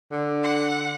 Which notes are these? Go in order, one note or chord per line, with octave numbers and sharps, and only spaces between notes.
D3
F#5